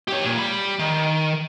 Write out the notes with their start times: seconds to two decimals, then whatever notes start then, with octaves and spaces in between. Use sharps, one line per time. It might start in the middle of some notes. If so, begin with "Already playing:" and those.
0.08 G4 C#5
0.24 A#2
0.38 G3 B5
0.79 D#3